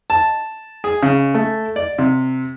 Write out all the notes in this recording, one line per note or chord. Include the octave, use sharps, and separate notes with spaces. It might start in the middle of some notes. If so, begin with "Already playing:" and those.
A5
G#4
C#3
A3
D5
C3